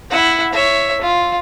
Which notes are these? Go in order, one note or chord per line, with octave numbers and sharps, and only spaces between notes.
E4 F#5
C#5 E5
F4